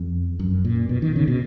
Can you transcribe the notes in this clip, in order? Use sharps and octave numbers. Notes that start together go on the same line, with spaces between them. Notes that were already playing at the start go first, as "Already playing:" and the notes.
Already playing: F2
F#2
A#2
B2
D#3
C#3
B2